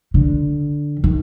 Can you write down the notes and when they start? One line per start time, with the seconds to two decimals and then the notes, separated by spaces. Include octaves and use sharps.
0.14 D3
1.04 D#3